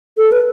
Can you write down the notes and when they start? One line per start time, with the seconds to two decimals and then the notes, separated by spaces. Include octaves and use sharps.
0.17 A4
0.32 B4